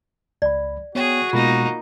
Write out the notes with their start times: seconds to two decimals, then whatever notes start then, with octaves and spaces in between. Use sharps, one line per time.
0.42 C#2 D5 B5
0.95 B3 F#4 G#4 C#5 G5
1.33 B2 G#3 A#3 B3 D#4 F4